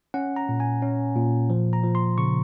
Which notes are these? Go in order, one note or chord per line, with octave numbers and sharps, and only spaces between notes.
C#4 F#5
A#5
A#2
G#5
C#4
A#2
F3
A#5
F3
C6
C#3 C#6